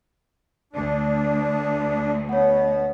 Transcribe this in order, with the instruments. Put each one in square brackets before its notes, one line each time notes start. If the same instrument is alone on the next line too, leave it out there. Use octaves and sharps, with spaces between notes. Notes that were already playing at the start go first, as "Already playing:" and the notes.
[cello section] D2 [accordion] D4
[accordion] B2 B3 [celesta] C#5 F#5